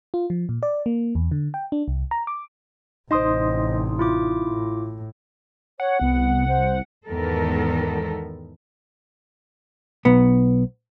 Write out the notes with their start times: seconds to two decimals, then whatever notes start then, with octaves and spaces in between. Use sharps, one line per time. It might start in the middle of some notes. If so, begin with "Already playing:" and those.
0.14 F4
0.30 F3
0.49 A#2
0.63 D5
0.86 A#3
1.15 E2
1.31 D3
1.54 G5
1.72 D4
1.88 C2
2.11 A#5
2.27 D6
3.11 A1 C3 D#4 C5 D#5 C6 D#6
3.99 E4 F4 D6
4.48 A2
5.80 C#5 F#5
6.01 C2 B3
6.48 C5
7.08 E2 G#2 D#3 B3 A4 A#4
10.05 B1 B3